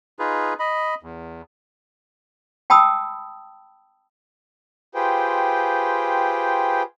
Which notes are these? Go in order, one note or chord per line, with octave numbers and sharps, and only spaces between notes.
D#4 F4 G#4 B4
D#5 B5
E2
G5 A5 B5 D#6 E6
F4 G4 G#4 B4 C5 G5